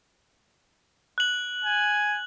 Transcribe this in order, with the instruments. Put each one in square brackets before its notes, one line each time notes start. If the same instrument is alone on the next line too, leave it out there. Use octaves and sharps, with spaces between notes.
[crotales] F#6 F#7
[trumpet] G#5